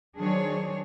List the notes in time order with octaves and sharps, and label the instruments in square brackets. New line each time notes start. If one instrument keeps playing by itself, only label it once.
[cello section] D#3 F#3 D4 G#4 C5 C#5